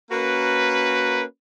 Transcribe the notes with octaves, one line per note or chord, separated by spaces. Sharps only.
A#3 C#4 F#4 A#4 B4